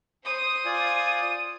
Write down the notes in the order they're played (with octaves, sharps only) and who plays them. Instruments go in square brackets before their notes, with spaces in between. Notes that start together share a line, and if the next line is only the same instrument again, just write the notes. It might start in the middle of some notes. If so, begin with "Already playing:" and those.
[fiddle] C5 D#6
[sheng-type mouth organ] F4 D5 G#5